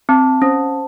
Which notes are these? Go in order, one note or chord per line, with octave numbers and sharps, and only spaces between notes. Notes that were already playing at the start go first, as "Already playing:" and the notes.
C4 A5
C#4 C5